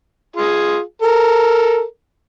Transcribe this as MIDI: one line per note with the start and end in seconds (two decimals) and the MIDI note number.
0.36 0.80 65
0.36 0.80 68
1.02 1.83 69
1.02 1.83 70